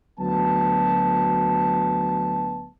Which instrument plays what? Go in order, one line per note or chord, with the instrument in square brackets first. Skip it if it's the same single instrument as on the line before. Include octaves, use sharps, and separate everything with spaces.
[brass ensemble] D2 F#3 B3 A5